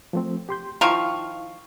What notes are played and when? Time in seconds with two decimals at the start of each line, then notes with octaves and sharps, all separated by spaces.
0.13 F3 A3 C4
0.49 G4 C6 G6
0.81 D#3 F3 E4 F5 C#6